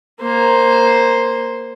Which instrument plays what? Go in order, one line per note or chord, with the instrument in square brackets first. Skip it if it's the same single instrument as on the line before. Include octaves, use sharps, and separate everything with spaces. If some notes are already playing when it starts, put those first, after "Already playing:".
[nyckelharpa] A#3 C5